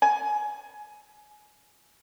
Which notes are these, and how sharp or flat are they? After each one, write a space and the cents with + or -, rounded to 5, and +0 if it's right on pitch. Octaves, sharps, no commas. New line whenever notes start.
G#5 +20